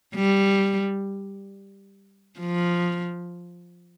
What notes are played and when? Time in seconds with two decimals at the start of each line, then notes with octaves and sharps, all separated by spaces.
0.15 G3
2.40 F3